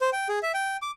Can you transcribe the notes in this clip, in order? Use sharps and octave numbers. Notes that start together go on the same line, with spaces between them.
C5
G5
G#4
E5
G5
D6